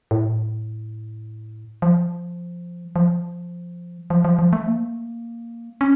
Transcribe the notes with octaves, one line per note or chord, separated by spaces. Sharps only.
A2
F3
F3
F3
F3
F3
A3
A#3
C#4